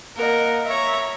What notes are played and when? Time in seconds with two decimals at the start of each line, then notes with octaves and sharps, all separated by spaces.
0.16 A#3 A#4 D#5 F#5
0.65 C#5 E5 A#5